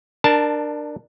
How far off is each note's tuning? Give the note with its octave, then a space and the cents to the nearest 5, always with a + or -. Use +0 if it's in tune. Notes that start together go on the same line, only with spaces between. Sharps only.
D4 +20 A#4 +0 A5 +0